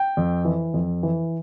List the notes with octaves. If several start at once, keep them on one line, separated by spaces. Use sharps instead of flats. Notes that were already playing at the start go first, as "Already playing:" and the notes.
Already playing: G5
F2
E3
F2
E3